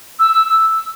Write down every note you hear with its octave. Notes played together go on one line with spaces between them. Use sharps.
E6